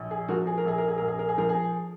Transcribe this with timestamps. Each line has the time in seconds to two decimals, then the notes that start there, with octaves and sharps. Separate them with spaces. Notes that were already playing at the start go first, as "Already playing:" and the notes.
Already playing: A#1
0.11 G#4
0.28 F3 F#4 A#4
0.47 G#4
0.58 A#4
0.65 A#1 G#4
0.78 A#4
0.88 G#4
0.98 A#1 A#4
1.08 G#4
1.19 A#4
1.29 G#4
1.38 F3 A#4
1.49 G#4